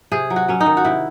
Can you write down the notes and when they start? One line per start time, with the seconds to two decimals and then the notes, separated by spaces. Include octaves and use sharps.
0.12 C3 G#4
0.30 F#3
0.36 F#4
0.48 F#3 C#4
0.60 D#4
0.66 D#3
0.77 F#4
0.85 C3 E4